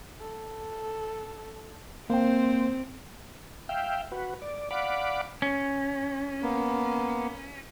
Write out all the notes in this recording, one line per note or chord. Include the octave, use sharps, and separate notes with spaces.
A4
A#3 C4 C5 G5
E5 F5 G5
F#4 B4
D5
D5 F5 F#5 B5 D6
C#4
A#3 B3